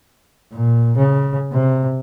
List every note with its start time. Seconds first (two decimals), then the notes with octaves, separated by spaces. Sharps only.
0.52 A#2
0.97 C#3
1.52 C3